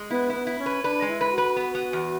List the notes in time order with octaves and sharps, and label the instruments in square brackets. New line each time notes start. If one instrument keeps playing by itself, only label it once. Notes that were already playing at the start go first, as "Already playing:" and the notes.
Already playing: [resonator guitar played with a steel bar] G#3
[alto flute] B3 [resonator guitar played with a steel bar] E4
[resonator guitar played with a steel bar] E4
[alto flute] B3
[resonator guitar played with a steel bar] E4
[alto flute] C#4
[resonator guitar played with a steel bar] B4
[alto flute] D4 [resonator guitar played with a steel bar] B4
[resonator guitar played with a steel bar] G#3
[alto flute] E4
[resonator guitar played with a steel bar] B4
[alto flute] F#4
[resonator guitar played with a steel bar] B4
B3
B3
E2